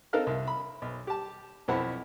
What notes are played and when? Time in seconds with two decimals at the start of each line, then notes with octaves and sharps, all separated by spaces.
0.13 C4 D#4 A4 A#4 F5 F6
0.27 C2
0.48 B5
0.82 B1
1.07 G4 A5
1.68 B1 F2 C4 E4 F#5 B5